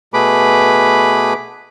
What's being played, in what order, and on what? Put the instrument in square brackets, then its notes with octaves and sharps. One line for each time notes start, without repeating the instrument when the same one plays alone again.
[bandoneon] B2 A3 G#4 B4 B5 D6